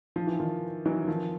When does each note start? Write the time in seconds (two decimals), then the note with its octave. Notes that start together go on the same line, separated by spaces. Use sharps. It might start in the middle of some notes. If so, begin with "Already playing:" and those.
0.16 F3
0.27 E3
0.40 D#3 F3
0.86 E3 F#3
1.07 D#3 F3